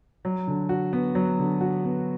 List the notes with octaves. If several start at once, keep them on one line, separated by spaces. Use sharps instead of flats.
F#3
D3
F#4
B3
F#3
D3
F#4
B3